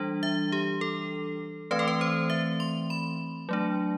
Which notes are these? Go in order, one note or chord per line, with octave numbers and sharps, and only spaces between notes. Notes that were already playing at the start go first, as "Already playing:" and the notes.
Already playing: E3 G3 D4
E5
G4
A4
E3 A3 C4 B4
A4
B4
C5
E5
C6
B5
F#3 A3 D4